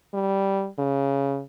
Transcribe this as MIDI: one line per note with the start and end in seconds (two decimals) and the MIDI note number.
0.14 0.67 55
0.79 1.41 49